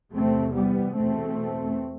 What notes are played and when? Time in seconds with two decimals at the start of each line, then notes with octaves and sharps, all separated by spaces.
0.12 E2 C3 A3 C4
0.54 G3 B3
0.96 E2 B2 A3 C4